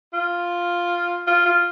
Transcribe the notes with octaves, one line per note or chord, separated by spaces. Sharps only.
F4
F4
F4